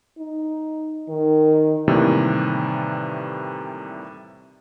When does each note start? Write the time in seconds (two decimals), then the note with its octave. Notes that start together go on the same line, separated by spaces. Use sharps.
0.19 D#4
1.09 D#3
1.88 A2 C3 D#3 E3 G3 A#3